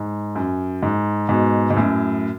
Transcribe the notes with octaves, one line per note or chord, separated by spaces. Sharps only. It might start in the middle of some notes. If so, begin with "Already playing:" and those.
Already playing: G#2
F#2
G#2
G#2 B2
G#2
F#2 A2